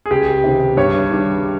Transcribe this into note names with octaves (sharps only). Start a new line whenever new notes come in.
G#4
C#2 G4
C3 D#3
G2 C#5
D#3 G3